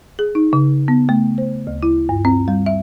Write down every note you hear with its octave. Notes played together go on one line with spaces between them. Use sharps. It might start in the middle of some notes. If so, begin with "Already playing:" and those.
G#4
D#4
C#3
B3
A3
C5
D2
E4
G2
C4
G3
E5